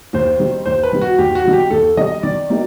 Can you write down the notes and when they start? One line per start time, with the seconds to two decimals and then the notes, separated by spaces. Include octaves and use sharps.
0.13 D#2 C5
0.40 D#3 G3
0.66 D#2 C5
0.83 B4
0.93 D#3 G3
1.01 F#4
1.18 D#2 G4
1.35 F#4
1.45 D#3 G3
1.53 G4
1.71 D#2 A4
1.97 D#3 G3 D#5
2.23 D#3 D5
2.49 F#3 A#3 D#4 G4